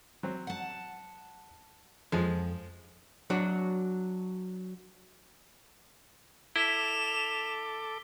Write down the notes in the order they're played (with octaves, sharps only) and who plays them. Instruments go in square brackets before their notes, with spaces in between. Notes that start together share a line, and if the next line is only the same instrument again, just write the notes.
[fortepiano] F#3 C4
[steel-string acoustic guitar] F#5 A5
[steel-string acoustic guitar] F2 [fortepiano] F3 G#3
[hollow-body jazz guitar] F#3 D4 F#4
[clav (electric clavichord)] E4 [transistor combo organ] A4 D6 [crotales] B6 G7 [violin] E7 F7